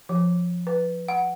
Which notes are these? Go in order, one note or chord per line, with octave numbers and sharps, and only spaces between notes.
F3
B4
F#5